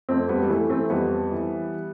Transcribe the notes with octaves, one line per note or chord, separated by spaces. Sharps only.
F2 A3 C4
G3 B3
G3
E3 A3
A3 C4
F2 G3 B3
E3